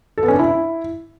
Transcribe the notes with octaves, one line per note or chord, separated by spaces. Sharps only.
A4
B3
C#4
D4
E4